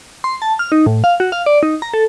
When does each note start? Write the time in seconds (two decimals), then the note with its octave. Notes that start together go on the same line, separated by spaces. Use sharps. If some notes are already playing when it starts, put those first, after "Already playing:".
0.24 C6
0.42 A5
0.59 F6
0.72 D#4
0.86 A2
1.04 F5
1.20 F#4
1.32 F5
1.46 D5
1.63 D#4
1.82 A#5
1.94 A4